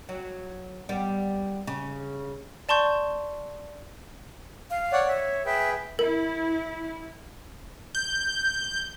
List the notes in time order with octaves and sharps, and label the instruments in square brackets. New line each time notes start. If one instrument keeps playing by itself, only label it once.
[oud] F#3
G3 B3
C#3
[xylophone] D5 A5 C6 C#6 G6
[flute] F5
[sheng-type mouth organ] C#5 D5 F#5
[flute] C#5 [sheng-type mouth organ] E5
[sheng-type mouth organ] G#4 B4 G5 [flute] E5
[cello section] E4 [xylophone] A#4
[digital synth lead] G6